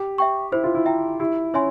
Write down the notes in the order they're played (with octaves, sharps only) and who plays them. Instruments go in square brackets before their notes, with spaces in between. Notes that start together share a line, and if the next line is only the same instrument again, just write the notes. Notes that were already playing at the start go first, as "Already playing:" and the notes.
Already playing: [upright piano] G4
[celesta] E5 G5 C#6
[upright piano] E4 [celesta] C5
[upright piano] F4
E4
[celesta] E5 G5 A#5
[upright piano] E4 [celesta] G4
[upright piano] C#4 [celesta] C#5 E5 G#5 C6